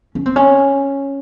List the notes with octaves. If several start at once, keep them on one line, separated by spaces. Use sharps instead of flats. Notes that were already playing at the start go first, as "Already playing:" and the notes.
C#4
C4
C#4